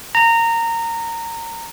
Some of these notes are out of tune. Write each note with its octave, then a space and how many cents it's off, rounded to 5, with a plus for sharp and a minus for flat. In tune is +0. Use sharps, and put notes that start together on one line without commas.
A#5 -20